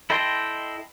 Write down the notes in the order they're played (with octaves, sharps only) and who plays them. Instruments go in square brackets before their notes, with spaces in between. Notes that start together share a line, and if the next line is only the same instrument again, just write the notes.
[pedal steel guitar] E4 A4 D#5 G5 C6